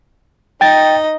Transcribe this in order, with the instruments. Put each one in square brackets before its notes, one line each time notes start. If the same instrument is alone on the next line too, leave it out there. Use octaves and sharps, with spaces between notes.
[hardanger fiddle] D#4 D#5 [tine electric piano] G5 A6